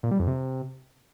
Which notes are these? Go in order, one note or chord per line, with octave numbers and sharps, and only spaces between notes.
A#2
G3
F2
C3